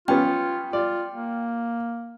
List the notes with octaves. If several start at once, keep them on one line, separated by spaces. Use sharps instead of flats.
B3 C#4 F4 G5
F4 D5
A#3